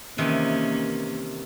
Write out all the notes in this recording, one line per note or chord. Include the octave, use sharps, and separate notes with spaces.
C3 D#3 E3 A#3 C#4